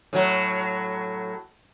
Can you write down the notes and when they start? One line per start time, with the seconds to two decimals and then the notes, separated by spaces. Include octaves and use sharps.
0.13 A2 F#3